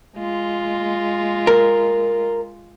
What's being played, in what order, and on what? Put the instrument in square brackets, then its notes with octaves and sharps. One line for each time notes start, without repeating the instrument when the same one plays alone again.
[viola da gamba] G#3 F4
[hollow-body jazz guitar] A#4